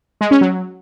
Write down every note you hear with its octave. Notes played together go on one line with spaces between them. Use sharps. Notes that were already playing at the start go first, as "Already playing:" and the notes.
G#3
C#4
F#3